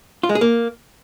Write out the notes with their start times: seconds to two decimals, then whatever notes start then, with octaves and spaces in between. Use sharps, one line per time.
0.23 F4
0.29 G#3
0.35 G#4
0.41 A#3